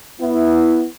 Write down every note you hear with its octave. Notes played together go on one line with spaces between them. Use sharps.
B3 E4